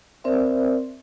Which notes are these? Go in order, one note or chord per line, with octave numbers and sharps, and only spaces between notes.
C4 A#4 C5 D5 E5